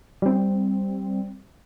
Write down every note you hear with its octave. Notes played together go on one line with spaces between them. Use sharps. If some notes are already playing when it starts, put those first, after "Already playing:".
G3 C4